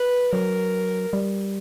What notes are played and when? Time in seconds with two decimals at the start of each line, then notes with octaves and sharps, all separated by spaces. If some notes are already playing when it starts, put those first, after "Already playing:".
Already playing: B4
0.33 F#3 A#4
1.13 G3